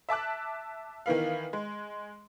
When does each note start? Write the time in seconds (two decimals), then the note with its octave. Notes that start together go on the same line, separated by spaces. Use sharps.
0.09 E5 A5 D6 F#6
1.06 D#3 E3 B3 F5
1.53 G#3